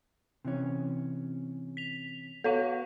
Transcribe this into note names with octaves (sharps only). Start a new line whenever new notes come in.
C3 E3 C#4
B6 F7
B3 F#4 A4 C#5 F5